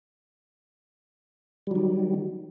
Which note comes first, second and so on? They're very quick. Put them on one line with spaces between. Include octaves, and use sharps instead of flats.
G3 F#3 D#3